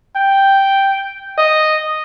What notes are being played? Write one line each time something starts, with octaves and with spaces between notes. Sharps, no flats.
G5
D#5